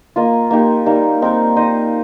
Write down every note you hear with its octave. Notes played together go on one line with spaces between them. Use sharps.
A#3 F4 D#5
A#3 D#4 G4
G3 A#3 D#4
C4 D#4 A#4
D#4 C5 D#5